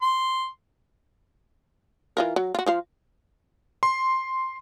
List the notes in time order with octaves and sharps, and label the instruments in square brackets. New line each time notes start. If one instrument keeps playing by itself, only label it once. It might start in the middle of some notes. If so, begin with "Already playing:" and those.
[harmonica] C6
[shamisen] E3 F4 A#4
F#3
F4 F#4
F3 F4 F5
[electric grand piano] C6